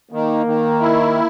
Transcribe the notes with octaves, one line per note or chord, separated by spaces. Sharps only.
D#3 A#3
D#3
E4